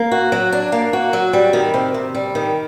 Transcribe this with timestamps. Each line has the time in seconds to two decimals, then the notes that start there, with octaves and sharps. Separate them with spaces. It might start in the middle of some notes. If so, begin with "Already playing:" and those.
Already playing: A#3
0.12 F#4
0.32 F#3
0.52 D4
0.72 A#3
0.93 F#4
1.13 F#3
1.33 G3
1.53 D#3
1.74 C3
1.94 C3
2.15 G3
2.35 D#3